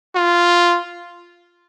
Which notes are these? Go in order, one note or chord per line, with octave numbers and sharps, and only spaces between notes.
F4